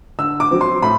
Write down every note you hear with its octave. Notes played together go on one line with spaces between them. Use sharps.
D3 E6
D6
F#3 C4
C6
A2 B5